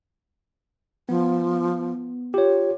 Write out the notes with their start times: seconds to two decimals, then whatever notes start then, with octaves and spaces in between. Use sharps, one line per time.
1.09 F3 B3
2.34 F4 G4 C#5